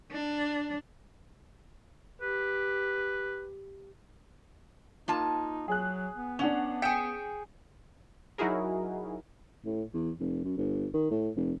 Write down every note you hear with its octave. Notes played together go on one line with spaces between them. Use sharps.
D4
G4 B4
A#3 D#4 F4 A5
F#3 G#4 F#6
B3
C#4 D4 F#5 F7
G#4 G5 B6 C#7 E7
F#3 D#4 E4 F#4 G#4 A#4
A2
E2
F1
F#2
G1
D#3
A2
F1